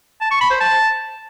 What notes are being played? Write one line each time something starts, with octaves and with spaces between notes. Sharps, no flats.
A5
C#6
B5
C5
A5